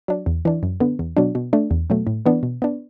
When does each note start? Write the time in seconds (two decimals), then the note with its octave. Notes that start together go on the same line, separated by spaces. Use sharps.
0.08 F#3 D4
0.26 E2
0.45 E3 D4
0.63 F#2
0.80 D3 B3
0.99 E2
1.17 B2 F#3 D4
1.35 B2
1.53 A3 D4
1.71 E2
1.90 B2 F#3 A3
2.07 A2
2.26 E3 B3 D4
2.43 B2
2.62 B3 D4